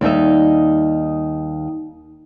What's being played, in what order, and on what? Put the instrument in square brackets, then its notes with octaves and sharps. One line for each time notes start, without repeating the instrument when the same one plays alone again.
[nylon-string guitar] D#2 G3 D#4 E5